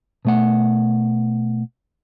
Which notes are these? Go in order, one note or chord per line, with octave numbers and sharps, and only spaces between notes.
B2 A3 F#5